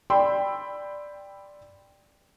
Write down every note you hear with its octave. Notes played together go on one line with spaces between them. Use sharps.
D5 G5 B5 C6 E6